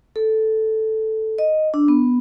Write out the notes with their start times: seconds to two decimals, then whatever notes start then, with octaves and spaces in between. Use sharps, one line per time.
0.16 A4
1.38 D#5
1.74 D4
1.88 B3